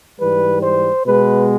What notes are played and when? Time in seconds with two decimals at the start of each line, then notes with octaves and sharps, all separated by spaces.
0.20 G#2 E3 G3 B4
0.63 C5
1.06 B2 G#3 B3 B4